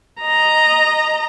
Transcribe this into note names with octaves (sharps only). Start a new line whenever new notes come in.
D#5 A#5